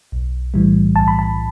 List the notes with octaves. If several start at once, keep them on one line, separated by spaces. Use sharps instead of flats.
B1
A2 E3 G3
B1 A5
B5
A5